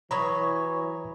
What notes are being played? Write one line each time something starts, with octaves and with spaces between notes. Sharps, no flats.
E3 F#3 C#5 A#5 B5 D#6